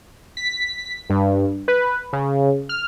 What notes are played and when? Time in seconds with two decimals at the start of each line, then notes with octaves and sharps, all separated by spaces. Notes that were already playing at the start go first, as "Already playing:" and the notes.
0.37 B6
1.10 G2
1.68 B4
2.13 C#3
2.69 F6